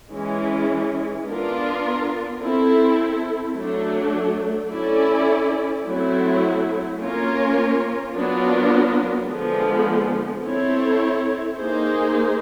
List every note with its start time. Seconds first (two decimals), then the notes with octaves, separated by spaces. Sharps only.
0.11 E3 G#3 C#4
1.26 B3 D4 F4 A#4
2.41 C4 E4 A4
3.55 F#3 A3 D4
4.70 C#4 E4 A4 D5
5.85 F#3 A3 C4 E4
6.98 A#3 C#4 F4 A#4 C#5
8.14 F#3 B3 D4 F4 A#4
9.27 D3 F3 G#3 B3
10.42 C4 E4 A4 C#5
11.57 A#3 D#4 G#4 C5